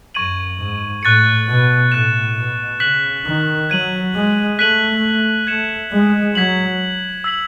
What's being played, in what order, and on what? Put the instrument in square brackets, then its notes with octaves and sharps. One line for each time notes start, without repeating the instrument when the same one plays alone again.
[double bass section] F#2 [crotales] C#6 G#6 D#7 F#7
[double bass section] G#2
[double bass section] A2 [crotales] C#6 F#6 A6 C#7
[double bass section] B2
[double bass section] A2 [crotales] F#6 A6 E7
[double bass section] B2
[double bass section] C#3 [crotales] F#6 B6 F#7
[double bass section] D#3
[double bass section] F#3 [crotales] G#6 D#7 F#7
[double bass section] G#3
[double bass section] A3 [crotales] F#6 B6 D#7 F#7
[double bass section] A3 [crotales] G#6 C#7 E7
[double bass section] G#3
[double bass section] F#3 [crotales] G#6 B6 F#7
[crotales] E6 G#6 B6 F#7